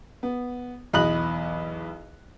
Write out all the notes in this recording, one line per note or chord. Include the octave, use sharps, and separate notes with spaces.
B3
B1 E2 D#5 B5 F#6 F#7